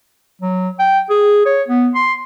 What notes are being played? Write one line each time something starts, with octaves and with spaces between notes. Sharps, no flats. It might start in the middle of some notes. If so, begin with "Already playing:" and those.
F#3
G5
G#4
C#5
B3
C6